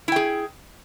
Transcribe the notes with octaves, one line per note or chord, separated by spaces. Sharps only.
E4 G#4 G5